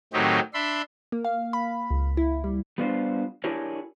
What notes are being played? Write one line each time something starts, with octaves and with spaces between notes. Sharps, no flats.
A2 D#3 F#3 C4 D#4 G4
D4 E5 B5 C6
A#3
F5
B5
C#2
E4
G3
G3 B3 D4 F4 C5
D4 E4 G4 G#4 A#4 C#5